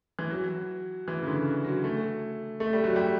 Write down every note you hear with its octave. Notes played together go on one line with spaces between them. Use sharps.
E3
F#3
E3
C#3
D3
F#3
A3
A3
G3
F#3
G3